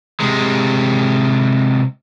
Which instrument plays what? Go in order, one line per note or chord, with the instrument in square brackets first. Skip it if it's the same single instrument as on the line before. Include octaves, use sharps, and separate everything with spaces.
[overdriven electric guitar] C3 G#3